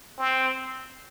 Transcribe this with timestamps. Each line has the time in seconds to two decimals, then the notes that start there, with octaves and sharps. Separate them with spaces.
0.18 C4